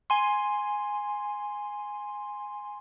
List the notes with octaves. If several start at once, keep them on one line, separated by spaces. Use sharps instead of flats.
G#5 C6